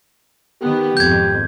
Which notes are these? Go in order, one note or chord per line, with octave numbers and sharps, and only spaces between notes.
D#3 B3 G4
G#1 F2 G6 G#6